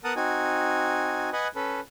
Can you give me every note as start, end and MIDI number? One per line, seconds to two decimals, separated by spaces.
0.04 0.13 59
0.04 0.13 70
0.04 0.13 78
0.04 0.13 81
0.04 0.13 87
0.16 1.30 60
0.16 1.30 63
0.16 1.30 66
0.16 1.30 80
1.33 1.48 71
1.33 1.48 75
1.33 1.48 78
1.33 1.48 80
1.55 1.80 61
1.55 1.80 69
1.55 1.80 71